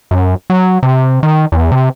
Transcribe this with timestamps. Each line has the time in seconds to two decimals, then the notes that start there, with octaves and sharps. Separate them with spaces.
0.11 F#2
0.50 F#3
0.83 C3
1.23 D#3
1.52 E2
1.72 C3